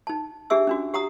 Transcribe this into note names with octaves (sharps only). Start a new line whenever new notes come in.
D#4 A5
D4 G4 G#4 E5 E6
C#4 D4 F#4
G4 F#5 A#5 D#6